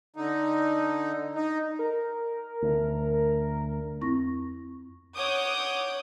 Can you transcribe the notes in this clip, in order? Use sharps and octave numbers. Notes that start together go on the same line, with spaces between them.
D3 D#4
D#4
A#4
D2
F2 C4 E4 C#6 A#6
C#5 F#5 D6 D#6 G6